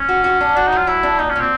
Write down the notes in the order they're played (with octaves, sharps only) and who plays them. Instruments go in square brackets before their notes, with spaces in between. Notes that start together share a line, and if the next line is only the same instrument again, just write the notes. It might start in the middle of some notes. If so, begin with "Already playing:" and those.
Already playing: [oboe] C#4
[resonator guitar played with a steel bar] F#4
F#4
D4
[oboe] D4 [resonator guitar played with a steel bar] F#4
[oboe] D#4
[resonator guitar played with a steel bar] F#3 [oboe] F4
[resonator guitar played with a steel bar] F#3 [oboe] E4
[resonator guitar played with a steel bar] D4
[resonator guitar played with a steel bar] A#2 [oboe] D#4
[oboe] C#4
[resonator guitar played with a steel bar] A#2 [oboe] C4